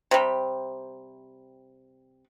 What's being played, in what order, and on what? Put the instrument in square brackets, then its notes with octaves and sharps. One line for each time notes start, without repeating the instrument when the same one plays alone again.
[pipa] C3 G3